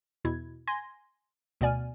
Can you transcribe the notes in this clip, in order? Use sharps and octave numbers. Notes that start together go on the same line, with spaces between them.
E2 B2 E4 G#6
G#5 C6 G#6 A#6
D2 B2 B3 D5 G#5 F6